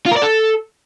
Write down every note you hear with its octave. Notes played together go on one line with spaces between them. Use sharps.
F4
A#4
D5
A4